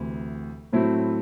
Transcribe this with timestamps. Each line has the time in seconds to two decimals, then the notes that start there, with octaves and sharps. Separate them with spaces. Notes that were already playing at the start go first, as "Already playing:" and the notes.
Already playing: D2 C3 E3
0.73 A2 F#3 A3 C4 E4